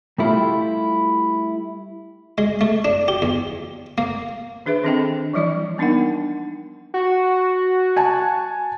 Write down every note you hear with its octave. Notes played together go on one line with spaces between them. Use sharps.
G3 A3 E4 F4 G4
G#3
A3
D4
G4
E2
A#3
D#3 D4 G#4 B4 E5
D#3 C4 D4 A4 D#5 G5
E3 F3 G3 E4 D5 D#5
A#3 B3 D4 D#4 A#4 F#5
F#4
G#5 A5